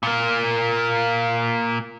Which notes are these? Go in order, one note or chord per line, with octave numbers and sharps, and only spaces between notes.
A#2 A#3